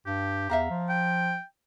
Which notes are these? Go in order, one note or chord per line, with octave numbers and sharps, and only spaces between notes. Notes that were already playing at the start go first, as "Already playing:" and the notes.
G2 G4
E2 E5 F5 A#5
F3
G5